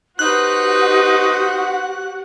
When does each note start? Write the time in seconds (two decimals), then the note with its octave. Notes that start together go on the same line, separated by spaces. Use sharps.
0.19 D#4 F#4 G4 B4 C5 F#5 F#6